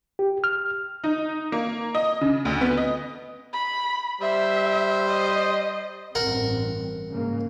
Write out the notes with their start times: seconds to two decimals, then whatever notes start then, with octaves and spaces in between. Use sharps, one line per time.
0.19 G4
0.44 F6
1.04 D#4
1.52 A#3
1.95 D#5
2.21 C#3
2.45 D2
2.61 B3
2.77 D#5
3.53 B5
4.21 G3 C5 E5
5.08 D#5
6.15 A1 G2 C4 A#4 F#5
7.12 G#2 C#3 A#3